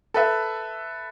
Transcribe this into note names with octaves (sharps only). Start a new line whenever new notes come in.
A4 B4 E5